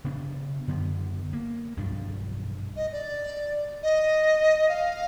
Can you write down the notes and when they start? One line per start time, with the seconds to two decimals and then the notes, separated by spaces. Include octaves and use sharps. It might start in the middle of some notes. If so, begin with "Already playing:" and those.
0.04 C#3 B3 D4
0.68 F#2 D3 B3
1.33 A#3
1.77 B1 G2 F3 D4
2.76 D#5
2.92 D5
3.83 D#5
4.69 F5